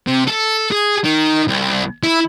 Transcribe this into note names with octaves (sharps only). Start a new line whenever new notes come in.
C3
A4
G#4
D#3
C2
E4